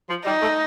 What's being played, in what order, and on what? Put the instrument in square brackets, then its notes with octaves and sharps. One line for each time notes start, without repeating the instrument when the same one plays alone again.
[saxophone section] F3
[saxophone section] G3 [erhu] D#4
[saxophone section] A3